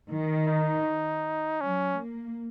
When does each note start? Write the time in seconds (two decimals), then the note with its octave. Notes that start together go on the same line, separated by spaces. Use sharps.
0.10 D#3
0.48 D#4
1.61 F#3 C#4
1.98 A#3